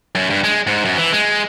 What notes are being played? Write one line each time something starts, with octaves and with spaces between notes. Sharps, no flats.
F#2
G2
G#3
G#2
F#2
E3
G#3